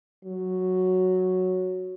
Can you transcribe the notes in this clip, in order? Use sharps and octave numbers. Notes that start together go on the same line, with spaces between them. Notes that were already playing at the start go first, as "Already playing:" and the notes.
F#3